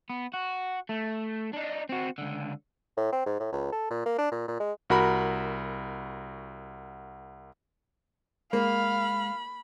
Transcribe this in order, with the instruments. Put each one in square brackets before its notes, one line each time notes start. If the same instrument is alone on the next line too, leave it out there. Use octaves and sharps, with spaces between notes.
[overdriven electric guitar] B3
F#4
A3
D4 D#4
C4 F#4
C#2 D3
[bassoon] A2
C4
G#2
A2
C#2
A4
A#2
A#3
D4
A#2
A#2
G#3
[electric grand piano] C2 F#4 A#4 B5
[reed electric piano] G#3 [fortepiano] A#3 [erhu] F5 [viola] B5